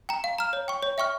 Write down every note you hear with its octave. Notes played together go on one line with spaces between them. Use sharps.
G5 A#5
F5
A#5 F6
C#5
G5 C#6
C#5
E5 G5 C#6 F6